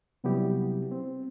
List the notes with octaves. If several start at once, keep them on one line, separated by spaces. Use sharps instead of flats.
C3 F#3 G3 B3 E4 G4
C4